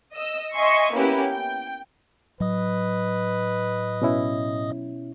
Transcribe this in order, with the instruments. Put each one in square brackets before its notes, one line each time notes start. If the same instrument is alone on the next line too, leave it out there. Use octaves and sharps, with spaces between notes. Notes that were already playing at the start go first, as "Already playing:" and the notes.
[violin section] D#5 E6
D#5 E5 G#5 C6 C#6 C#7
A#3 B3 C#4 E4 G4 B4
G5
[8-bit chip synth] A2 D#5 D#6 [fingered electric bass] F#3 [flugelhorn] B4
[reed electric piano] B2 C#4 E4